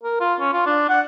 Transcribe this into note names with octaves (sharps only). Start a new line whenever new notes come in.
A#4
F4
C#4
F4
D4
F#5